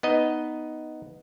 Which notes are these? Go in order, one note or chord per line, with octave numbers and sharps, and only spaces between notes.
B3 D#4 D#5